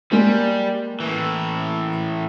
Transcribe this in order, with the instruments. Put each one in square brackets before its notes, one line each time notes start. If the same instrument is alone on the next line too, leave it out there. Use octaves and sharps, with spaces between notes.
[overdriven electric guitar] G3 [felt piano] G#3 A#3
[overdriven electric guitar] A2 E3